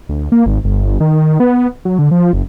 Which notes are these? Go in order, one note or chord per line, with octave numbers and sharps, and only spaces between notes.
D2
A#3
G#1
G1
D#3
B3
F#3
D3
F3
F#1